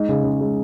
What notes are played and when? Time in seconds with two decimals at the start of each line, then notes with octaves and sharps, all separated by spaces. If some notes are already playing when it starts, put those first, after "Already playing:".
Already playing: G#3 D#4
0.09 C#3
0.23 C#3
0.41 G#3